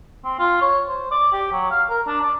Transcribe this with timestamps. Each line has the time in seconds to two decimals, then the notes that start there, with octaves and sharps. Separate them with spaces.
0.24 C4
0.39 F4
0.61 C#5
0.88 C5
1.12 D5
1.33 G4
1.52 F#3
1.71 F5
1.89 A#4
2.07 D4
2.21 D5